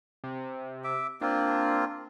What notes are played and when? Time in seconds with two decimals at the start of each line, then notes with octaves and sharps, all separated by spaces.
0.24 C3
0.84 E5 D6
1.21 A#3 C4 D4 F4